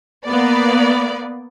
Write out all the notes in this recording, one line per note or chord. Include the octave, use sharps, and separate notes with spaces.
A#3 B3 D5